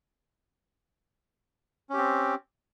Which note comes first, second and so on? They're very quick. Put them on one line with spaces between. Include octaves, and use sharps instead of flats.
C#4 G4 C4